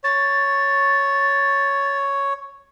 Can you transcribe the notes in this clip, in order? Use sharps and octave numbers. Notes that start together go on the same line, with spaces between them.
C#5 A6